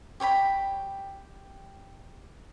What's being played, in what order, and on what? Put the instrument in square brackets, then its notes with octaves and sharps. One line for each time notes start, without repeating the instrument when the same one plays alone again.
[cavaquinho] G4 C#5 G5 B5